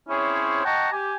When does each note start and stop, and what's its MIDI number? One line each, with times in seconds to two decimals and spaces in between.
0.09 0.65 60
0.09 0.65 61
0.09 0.65 64
0.09 0.65 68
0.09 0.65 72
0.09 0.65 73
0.65 0.89 75
0.65 0.89 78
0.65 0.89 79
0.65 0.89 81
0.65 0.89 82
0.65 0.89 85
0.93 1.16 67
0.93 1.16 80